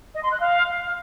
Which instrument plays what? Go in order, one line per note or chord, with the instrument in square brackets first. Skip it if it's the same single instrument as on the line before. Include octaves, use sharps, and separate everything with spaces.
[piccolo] D#5
C6
F#6
F5